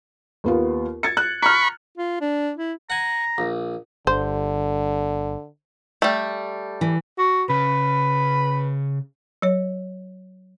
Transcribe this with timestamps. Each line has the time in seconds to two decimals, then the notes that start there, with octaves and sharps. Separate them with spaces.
0.44 D#2 B3 F4
1.03 G#6 A6 C#7
1.17 F#6
1.43 A#5 B5 C#6 F6
1.97 F4
2.21 D4
2.57 E4
2.90 F#5 G#5 A#5
3.38 A#1
4.07 G1 D3 C5
6.02 G3 A3
6.81 E3
7.18 F#4
7.50 C#3 B4
9.42 F#3 C#5